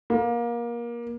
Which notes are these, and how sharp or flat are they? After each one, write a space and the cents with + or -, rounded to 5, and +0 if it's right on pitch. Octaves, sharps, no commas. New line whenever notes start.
A#3 +25